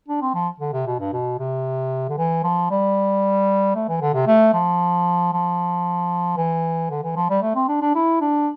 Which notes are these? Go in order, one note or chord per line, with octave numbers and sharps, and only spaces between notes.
D4
C4
F3
D3
C3
B2
G2
B2
C3
D3
E3
F3
G3
A3
E3
D3
C3
A3
F3
F3
E3
D3
E3
F3
G3
A3
C4
D4
D4
E4
D4